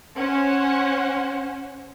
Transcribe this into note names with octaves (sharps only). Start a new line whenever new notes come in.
C#4 C5 F#5